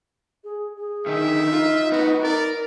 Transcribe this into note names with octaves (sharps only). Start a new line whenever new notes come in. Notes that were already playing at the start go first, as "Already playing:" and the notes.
G#4
G#4
D3 D#3 D#4 E5
D#4 F4
C4 F#4 B4
A#4 D5